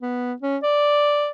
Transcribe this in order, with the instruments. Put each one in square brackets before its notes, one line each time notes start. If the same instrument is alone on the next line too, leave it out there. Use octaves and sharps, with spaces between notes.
[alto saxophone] B3
C#4
D5